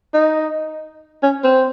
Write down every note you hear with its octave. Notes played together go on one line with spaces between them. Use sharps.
D#4
C#4
C4